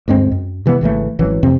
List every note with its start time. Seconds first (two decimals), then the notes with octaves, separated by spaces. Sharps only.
0.08 D2 G2 G#3 C4
0.32 F#2
0.66 C3 E3 F3 B3
0.81 G#1 C#3 E3 A3
1.19 G#1 E3 F#3 C#4
1.43 F2 C3 C4